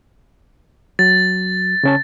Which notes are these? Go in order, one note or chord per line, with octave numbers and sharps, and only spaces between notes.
F#3 A6
C#3 C#4 A5